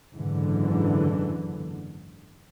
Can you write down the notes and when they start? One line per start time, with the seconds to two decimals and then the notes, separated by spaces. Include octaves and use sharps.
0.14 F#1 G#2 D3 E3